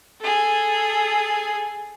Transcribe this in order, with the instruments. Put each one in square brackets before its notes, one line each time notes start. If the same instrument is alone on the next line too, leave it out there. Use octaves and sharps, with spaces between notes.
[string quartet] G#4 A4